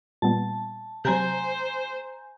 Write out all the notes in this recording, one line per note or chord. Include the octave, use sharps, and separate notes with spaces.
A#2 G3 B3 A5
C3 F#3 C5 G#5 A#5 G6